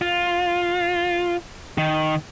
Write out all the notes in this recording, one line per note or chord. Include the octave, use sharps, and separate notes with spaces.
F4
D#3